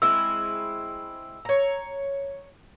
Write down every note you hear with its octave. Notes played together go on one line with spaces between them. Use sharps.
G#3 C4 E4 E6
C#5 A#5